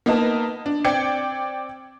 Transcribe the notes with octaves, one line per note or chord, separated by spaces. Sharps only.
A#3 B3 D#4 B4 D#5 A5
D4
C4 D5 G5 G#6 C#7